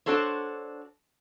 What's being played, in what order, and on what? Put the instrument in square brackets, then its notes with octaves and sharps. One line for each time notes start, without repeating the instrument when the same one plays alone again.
[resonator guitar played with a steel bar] D4 F#4 A4 C5 C#5